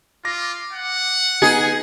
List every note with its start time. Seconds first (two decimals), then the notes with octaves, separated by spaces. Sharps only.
0.25 F4 D6 A#6
0.73 F#5
1.42 B3 D#4 G#4